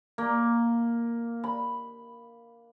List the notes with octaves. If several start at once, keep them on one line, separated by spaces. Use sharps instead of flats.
A#3
B5